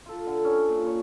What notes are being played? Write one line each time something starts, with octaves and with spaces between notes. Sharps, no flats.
F4 A4
D3
C#4
A#2
C#5